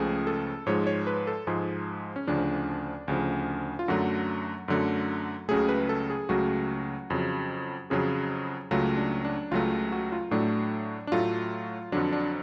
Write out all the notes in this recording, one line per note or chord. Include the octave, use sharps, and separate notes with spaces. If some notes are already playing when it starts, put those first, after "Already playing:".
Already playing: C#2 C#3 F3 A3 G#4
A4
G#2 F3 G#3 C#5
C#5
B4
A4
G#2 F3 G#3 G#4
C#4
D2 C#3 F3 D4
D2 C#3 F3
F4
F#2 D3 F#3 A3 F#4
F#2 D3 F#3 A3
C#2 C#3 F#3 A3 G#4
B4
A4
G#4
C#2 C#3 F#3 A3 F#4
F2 C#3 F#3
F2 C#3 F#3 G#4
C#2 C#3 F#3 A3 F4
D4
D4
C#2 C#3 F#3 A3 F4
F#4
F4
A2 F#3 A3 D4
D4
A2 F#3 A3 F4
F2 D3 F#3 D4
D4